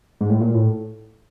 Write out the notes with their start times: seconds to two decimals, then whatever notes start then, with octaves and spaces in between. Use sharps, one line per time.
0.21 G#2
0.30 A2
0.41 A#2
0.54 A2